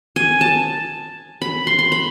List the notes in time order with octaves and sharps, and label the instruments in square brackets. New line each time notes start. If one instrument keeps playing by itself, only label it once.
[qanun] G#5
A5
B5
C6
C6
B5